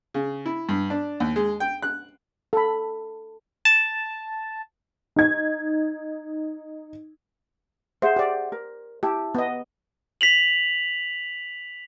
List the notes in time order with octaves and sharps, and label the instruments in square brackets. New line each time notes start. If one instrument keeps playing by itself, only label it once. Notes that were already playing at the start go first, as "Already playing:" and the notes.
[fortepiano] C#3
E4
G2
D4
D#2
G#3
G5
F#6
[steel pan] A4 B5
[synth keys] A5
[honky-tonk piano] D#4 G#6
[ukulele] G#4 E5 F#5 [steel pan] C5
[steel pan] G4 D5
[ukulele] A#4
[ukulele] E4 A5 [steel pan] G4
[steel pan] B3 D#5
[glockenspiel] B6 F7 F#7